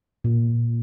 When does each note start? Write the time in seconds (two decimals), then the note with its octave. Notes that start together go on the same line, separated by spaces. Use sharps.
0.24 A#2